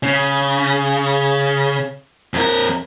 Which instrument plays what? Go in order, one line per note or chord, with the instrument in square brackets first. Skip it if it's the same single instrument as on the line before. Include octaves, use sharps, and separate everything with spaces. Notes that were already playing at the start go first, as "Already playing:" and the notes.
[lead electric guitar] C#3
F2 A#4